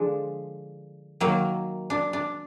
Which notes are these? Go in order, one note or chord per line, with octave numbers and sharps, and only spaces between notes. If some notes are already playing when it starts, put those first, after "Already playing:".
Already playing: D3 F3 G#3 D4
D#3 F#3 A#3
D4
D4